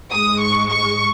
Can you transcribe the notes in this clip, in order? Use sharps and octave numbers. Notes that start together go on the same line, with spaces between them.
G#2 G#3 D#6
C#6
C#6